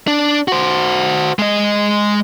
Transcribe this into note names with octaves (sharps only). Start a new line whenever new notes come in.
D4
F#4 C5
G#3 D#5